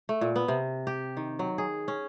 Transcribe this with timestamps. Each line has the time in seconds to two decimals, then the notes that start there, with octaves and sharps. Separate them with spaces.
0.09 A3
0.21 A#2
0.36 B3
0.48 C3
0.87 G4
1.17 D#3
1.39 F#3
1.58 G#4
1.88 C#4